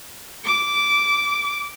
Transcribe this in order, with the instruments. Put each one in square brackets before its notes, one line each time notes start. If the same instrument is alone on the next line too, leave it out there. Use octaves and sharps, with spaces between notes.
[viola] D6